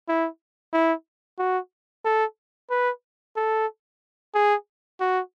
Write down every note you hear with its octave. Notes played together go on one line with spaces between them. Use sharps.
E4
E4
F#4
A4
B4
A4
G#4
F#4